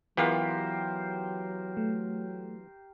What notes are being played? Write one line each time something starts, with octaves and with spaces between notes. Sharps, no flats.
E3 F#3 B3 F4 G4 A#4 C5
A3